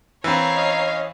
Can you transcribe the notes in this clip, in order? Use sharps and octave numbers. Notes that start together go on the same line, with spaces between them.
E3 C4 C#5 F5 A#5
C#4 D#5